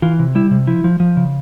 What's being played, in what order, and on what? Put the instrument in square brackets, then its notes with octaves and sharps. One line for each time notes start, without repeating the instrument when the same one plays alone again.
[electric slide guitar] E3 F4
C3
G3 E4
C3
F3 E4
F3
F3
C#3